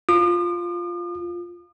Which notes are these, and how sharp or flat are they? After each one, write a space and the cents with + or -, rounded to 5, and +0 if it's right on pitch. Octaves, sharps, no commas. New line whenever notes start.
F4 +0 D#6 -45